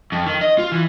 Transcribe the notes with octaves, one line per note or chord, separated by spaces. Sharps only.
F2
D#3
D#5
F4
E3